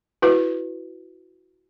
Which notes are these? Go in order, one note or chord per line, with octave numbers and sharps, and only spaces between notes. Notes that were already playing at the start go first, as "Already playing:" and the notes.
E4 F#4 B4